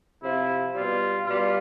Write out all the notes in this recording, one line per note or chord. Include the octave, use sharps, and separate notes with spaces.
C3 F3 E4
B2 G3 F4
B2 G3 F4